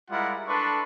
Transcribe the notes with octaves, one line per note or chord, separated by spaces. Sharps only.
G3 G#3 E4 F4 A#4 F#5
D4 A4 B4 D5 C6 C#6